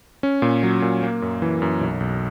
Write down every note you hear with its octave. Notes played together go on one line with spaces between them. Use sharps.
C#4
A#2
F#3
A#2
A#3
F#2
E3
F#2
B1
B1